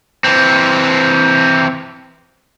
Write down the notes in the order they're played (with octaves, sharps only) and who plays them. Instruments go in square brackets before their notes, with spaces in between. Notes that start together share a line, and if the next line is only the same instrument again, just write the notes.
[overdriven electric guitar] E3 C4